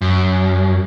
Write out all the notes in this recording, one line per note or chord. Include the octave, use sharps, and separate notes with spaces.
F#2